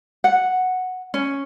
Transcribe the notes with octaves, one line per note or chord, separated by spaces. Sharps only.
F#5
C#4